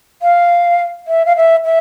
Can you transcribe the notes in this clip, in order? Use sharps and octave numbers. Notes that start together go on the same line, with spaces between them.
F5
E5
F5
E5
E5